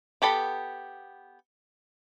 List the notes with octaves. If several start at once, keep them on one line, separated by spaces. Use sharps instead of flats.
B3 G4 A4 B5